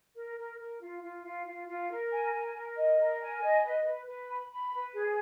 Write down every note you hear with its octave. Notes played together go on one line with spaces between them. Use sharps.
A#4
A#4
A#4
F4
F4
F4
F4
F4
A#4
G#5
A#4
A#4
D#5
A#4
G#5
D#5
B4
B4
B4
B5
B5
B4
G#4